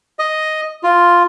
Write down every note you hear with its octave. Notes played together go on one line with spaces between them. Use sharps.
D#5
F4